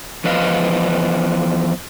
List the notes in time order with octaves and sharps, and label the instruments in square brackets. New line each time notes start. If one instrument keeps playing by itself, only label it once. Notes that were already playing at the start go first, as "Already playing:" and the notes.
[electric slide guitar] E2 F3 B4 D#5 F5